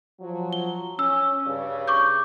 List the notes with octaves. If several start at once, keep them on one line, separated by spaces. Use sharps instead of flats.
F3 F#3
G7
C#4 E6
G2 C#3
C#6 D6 G6